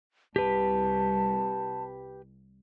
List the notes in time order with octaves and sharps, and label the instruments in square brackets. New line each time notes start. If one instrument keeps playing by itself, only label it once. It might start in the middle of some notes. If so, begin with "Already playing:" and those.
[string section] C2 [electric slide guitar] G4 B4 [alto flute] A5